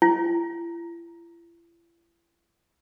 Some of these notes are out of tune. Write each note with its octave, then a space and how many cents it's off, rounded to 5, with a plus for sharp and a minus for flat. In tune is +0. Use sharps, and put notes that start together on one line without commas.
E4 +45